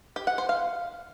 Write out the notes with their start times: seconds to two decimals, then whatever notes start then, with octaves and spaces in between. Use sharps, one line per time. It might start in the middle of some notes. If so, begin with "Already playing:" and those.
0.16 G4
0.27 F#5
0.38 C5
0.49 F5